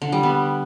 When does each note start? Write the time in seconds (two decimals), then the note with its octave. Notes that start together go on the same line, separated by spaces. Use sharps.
0.02 D3
0.12 G3
0.23 B3